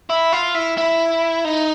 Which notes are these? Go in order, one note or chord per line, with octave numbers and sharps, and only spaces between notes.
E4
F4
E4
E4
D#4